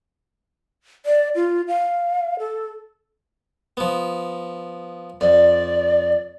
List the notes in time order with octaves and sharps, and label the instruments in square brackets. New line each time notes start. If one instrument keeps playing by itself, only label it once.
[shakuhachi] D5
F4
F5
A4
[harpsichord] F3 B3
[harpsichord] F2 [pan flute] D5